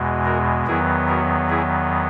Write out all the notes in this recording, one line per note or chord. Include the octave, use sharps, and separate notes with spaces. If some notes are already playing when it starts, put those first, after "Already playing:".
Already playing: E2 B2 G#3
F#4 A#4
E2 D#3 F#3 B3 E4 G#4
F#4 A#4
E4 G#4